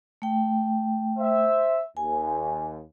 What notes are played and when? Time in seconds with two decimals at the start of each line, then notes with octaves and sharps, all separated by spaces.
0.22 A3 G5
1.18 C5 E5
1.97 D#2 G#5